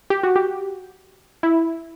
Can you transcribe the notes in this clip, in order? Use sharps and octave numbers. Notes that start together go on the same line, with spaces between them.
G4
F#4
G4
E4